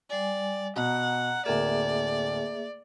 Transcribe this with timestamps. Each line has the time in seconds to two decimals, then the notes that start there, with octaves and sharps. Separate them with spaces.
0.10 G3 D5 G#5
0.76 B2 F#5 A#5
1.46 D1 A#3 G#4 A#4 D5 E5